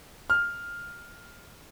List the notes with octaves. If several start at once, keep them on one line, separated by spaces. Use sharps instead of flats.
F6